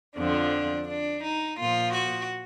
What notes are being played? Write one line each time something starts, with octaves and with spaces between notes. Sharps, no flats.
F2 D3 F3 D4
D4
D#4
A#2 F3 F4
F#4